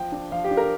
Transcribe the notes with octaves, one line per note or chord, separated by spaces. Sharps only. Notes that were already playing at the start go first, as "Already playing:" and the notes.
Already playing: F3 G5
D4
F3 F5
G4
D4
A#4